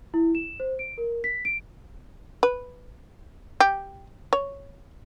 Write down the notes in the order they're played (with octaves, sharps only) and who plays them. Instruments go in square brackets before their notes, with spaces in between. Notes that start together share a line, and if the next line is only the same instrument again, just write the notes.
[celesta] E4
E7
C5
D7
A#4
B6
D7
[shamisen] B4
G4
C#5